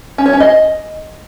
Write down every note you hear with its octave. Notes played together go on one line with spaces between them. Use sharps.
C#4
C#5
C#4
D#5